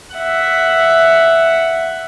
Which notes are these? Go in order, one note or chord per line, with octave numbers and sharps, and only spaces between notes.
E5 F#5